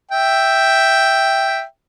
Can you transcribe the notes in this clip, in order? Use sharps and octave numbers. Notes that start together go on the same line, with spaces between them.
E5 G5